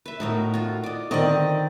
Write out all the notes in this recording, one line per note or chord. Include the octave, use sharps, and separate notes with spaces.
B4 E5
A2 D#4 F#4 A#4
F4 F#4
D5 D#5
D3 D#3 C4 D5 D#5